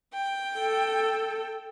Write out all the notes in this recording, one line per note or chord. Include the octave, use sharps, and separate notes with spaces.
G5
A4